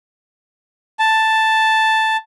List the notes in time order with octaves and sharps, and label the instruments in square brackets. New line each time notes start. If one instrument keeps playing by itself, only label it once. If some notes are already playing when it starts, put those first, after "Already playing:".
[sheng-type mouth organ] A5